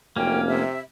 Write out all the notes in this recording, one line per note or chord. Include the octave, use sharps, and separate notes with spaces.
F1 F#2 A#3 C#4 G5
C3 E5